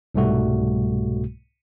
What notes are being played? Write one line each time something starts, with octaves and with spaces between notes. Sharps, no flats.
C2 G#2 B2 G3 A3 F#4